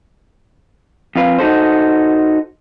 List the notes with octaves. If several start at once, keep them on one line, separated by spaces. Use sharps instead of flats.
F2 F4 B4
D#4 F#4 A4 C5